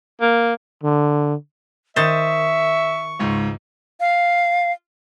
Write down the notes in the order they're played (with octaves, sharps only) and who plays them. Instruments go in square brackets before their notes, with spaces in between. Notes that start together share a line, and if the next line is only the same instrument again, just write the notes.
[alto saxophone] A#3
[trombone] D3
[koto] D#3 C5 [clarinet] E5 [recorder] C#6 [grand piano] D#6 A6 E7
[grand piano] C#2 G#2
[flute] F5